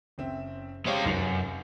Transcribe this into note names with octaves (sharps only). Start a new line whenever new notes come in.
F#1 C4 E5
G#3 G4 C5 C#5 F5
F1 F#2 D#4 F7